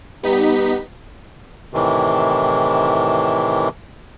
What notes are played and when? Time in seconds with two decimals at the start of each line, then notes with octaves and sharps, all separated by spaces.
0.24 G3 B3 D#4 G4 B6
1.74 A2 C3 D#3 E3